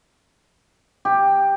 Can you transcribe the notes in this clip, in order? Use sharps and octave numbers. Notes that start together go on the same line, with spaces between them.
G4